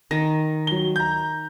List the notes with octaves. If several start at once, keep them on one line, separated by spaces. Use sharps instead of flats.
D#3 A#6
F#3 G7
A#5 G6